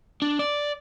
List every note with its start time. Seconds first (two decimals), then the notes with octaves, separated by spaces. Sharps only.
0.22 D4
0.39 D5